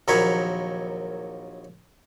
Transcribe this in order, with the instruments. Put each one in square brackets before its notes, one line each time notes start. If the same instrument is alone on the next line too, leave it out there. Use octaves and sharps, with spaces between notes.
[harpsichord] A#1 D#2 F#3 A#4 C#5 B5